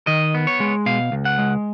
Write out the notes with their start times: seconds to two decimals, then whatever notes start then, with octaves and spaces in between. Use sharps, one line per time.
0.07 D#3 D#5
0.34 B3
0.47 C#5
0.60 G#3
0.86 B2 F5
1.12 C#2
1.25 F#5
1.38 G#3